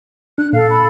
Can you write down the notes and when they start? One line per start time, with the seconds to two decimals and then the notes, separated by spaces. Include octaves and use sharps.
0.38 D4 F#6
0.53 A#2 A4 F5
0.69 B5